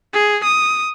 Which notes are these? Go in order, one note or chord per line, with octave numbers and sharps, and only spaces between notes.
G#4
D#6